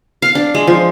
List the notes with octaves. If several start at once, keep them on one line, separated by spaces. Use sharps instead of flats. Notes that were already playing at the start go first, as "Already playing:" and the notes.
F5
D4
G#3
F3